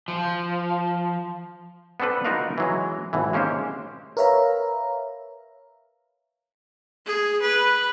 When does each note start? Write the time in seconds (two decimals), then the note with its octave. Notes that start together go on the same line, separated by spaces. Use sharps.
0.08 F3
2.00 B3 C4 D4 A4 B4
2.25 D#4 F4 F#4 A#4 B4 F5
2.58 E3 F#3 G#3
3.13 G#1 B2 E3
3.33 G#3 A#3 C#4 G4 C5
4.17 A#4 B4 C#5 E5 F5 A#5
7.06 G#4
7.42 B4